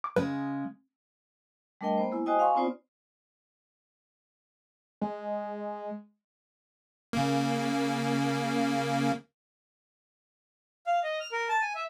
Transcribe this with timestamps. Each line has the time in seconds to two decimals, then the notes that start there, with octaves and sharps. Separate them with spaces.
0.04 D6
0.16 C#3 G#3 B4
1.81 G3 A3 D4 A#4 D#5 G5
1.97 A#3 B3 C5
2.12 G#3 E4
2.26 F#4 C5 D#5 G5 G#5 D#6
2.39 F5 G#5 C6 C#6
2.55 B3 C4 D#4 F4 C5 D5
5.02 G#3
7.13 C#3 A#3
10.87 F5
11.03 D#5
11.20 F6
11.32 A#4
11.49 A5
11.62 G#5
11.75 E5